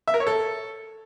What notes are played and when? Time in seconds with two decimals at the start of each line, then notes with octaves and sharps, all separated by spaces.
0.08 E5
0.14 A#4
0.20 C#5
0.27 A4